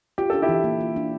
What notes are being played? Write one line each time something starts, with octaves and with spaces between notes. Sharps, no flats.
F4 G4
D4 A4
E4 G4
E3
A#3
F4
D4